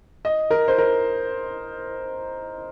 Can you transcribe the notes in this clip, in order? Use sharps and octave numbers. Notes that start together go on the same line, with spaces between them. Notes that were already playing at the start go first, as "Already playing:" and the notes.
D#5
A#4
C5
A#4